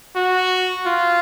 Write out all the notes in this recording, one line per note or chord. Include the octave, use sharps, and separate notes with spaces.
F#4
F4